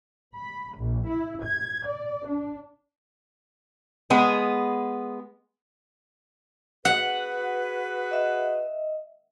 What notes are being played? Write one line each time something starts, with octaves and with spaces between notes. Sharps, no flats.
B5
A#1
E4
G#6
D5
D4
G#3 B3 G#4
F#4 G#4 B4 F#5
D#5 E5